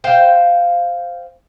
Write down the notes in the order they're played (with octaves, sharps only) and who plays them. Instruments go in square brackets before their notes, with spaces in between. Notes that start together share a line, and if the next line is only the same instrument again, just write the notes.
[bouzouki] C5 F5 G5